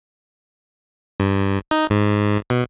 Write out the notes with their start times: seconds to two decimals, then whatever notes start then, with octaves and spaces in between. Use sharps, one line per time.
1.20 G2
1.71 D#4
1.90 G#2
2.50 B2